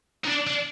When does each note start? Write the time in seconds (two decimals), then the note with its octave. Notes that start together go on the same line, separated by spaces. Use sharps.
0.25 D#4
0.28 D4
0.47 D4